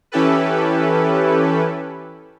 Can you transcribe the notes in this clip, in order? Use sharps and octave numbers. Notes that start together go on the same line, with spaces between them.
E3 C#4 E4 G4 A4 B4